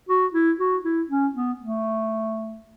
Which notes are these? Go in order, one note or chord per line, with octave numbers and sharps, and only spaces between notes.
F#4
E4
F#4
E4
C#4
B3
A3